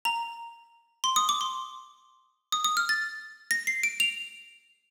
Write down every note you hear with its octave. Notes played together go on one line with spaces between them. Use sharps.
A#5
C6
D#6
D6
C6
D#6
D#6
F6
A6
A#6
C7
D7
F7